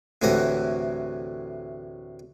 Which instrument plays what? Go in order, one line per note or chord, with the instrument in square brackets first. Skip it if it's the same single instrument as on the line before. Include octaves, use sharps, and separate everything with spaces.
[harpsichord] D2 A2 C3 E3 D#5 F#5